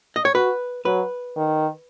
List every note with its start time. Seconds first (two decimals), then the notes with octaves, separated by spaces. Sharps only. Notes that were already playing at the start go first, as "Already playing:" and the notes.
0.16 D#5
0.25 C#5
0.35 F#4 B4
0.85 F#3 B4
1.36 D#3